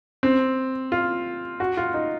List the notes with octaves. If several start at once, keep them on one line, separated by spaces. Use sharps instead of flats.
C4
F4
F#4
F4
D#4